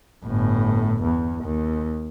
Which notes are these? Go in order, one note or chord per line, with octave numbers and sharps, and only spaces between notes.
G1 A2
E2
D#2